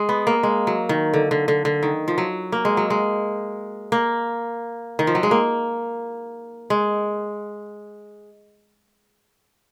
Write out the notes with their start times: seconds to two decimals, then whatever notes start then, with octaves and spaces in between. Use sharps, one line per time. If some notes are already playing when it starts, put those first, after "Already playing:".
Already playing: G#3
0.09 B3
0.27 A#3
0.43 G#3
0.67 F#3
0.89 D#3
1.14 D3
1.31 D3
1.48 D3
1.65 D3
1.83 D#3
2.08 F3
2.18 F#3
2.52 A#3
2.65 G#3
2.77 F#3
2.90 G#3
3.92 A#3
4.99 D#3
5.07 F3
5.15 F#3
5.23 G#3
5.31 A#3
6.70 G#3